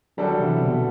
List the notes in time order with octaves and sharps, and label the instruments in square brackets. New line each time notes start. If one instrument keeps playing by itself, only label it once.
[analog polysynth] D3 F#3 [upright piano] G3 D4 F#4 A4
[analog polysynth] C3 E3
B2 D3